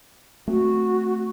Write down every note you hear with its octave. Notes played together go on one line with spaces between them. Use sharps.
A3 C4 F#4